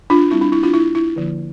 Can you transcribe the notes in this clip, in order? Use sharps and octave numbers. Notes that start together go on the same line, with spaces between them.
D4 F4
G3 C4 E4
D4
E4
D4 F4
E4
E4
D3 F3 A#3